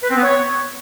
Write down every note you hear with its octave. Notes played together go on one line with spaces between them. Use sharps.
B4
C4
B3
C#5